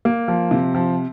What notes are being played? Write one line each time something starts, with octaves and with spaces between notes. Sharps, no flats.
A#3
F3
C3
F3